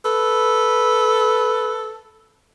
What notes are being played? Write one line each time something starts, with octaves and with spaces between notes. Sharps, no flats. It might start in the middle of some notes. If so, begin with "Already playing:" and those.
A4 B4